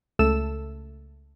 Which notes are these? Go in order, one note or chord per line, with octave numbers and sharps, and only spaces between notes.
C#2 A3 A4 E6 E7